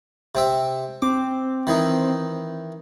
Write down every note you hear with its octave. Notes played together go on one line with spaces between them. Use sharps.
C3 C4 E5
C4 D6
D#3 E3 D#4